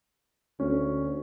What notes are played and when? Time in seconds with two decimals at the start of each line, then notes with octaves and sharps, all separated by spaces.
0.60 D2 C#4